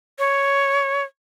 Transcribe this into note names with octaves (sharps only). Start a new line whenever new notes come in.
C#5